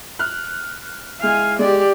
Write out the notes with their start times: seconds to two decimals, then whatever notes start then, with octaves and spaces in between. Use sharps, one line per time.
0.19 F6 F#6
1.21 G#3 E4 F5 G#5
1.59 G#3 G4 D5